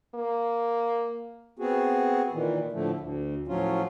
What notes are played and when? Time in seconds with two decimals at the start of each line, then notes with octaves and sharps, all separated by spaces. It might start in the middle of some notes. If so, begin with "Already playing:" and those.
0.15 A#3
1.59 B3 C4 F#4 G#4
2.32 A#2 D#3 E3
2.72 A2 D3 F3 A3
3.00 D2
3.48 A2 F3 F#3 C#4 F4